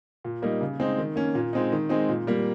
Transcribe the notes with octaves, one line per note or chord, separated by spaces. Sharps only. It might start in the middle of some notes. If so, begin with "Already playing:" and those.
A#2
G3 A#3 D#4
C#3
G#3 C4 D#4
D#3
A#3 C#4
A#2
G#3 C4 D#4
D#3
G#3 C4 D#4
A#2
G3 A#3